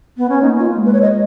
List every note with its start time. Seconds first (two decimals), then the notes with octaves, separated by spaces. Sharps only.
0.18 B3
0.29 C#4
0.42 A#3 D#4
0.59 F4
0.77 G#3
0.85 B4
0.93 C#5
1.02 D#5